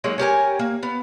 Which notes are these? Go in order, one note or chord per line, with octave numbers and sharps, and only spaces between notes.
F#3 G#3 A#3 D#4
C#4 G4 A#4 G#5
A#3
B3